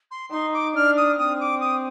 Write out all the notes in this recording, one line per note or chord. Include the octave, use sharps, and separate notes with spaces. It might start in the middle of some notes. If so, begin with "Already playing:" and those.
C6
D#4 C6
D6
D4 F6
D#6
C4 D#6
D6
D#6